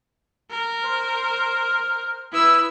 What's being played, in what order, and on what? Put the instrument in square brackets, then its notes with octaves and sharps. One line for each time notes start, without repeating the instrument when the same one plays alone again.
[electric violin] A#4
[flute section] C5 F6
[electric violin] E4 E6 [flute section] B4 B5 D#6